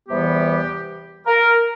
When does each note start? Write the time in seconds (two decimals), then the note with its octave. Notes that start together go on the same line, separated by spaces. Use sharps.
0.08 E2 C3 E3 G3 B3 G4
1.26 A#4